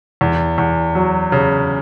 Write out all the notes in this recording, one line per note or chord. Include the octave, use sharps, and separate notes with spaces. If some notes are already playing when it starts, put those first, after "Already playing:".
E2
E2
F#3
C#3